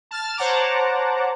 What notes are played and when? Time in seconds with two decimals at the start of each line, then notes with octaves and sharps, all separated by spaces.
0.11 A5 F6 A6
0.37 C5 C#5 F#5 A5 A#5 D6